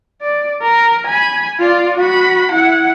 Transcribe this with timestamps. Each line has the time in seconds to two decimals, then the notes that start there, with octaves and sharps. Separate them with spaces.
0.21 D5
0.61 A#4
1.07 G#5 B5
1.60 F4 D5
1.97 F#4 B5
2.51 E4 F#5